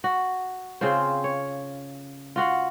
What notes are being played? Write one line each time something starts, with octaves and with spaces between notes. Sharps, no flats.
F#4
C#3 C4 F4 C5
C#5
F4 F#4 F5 F#5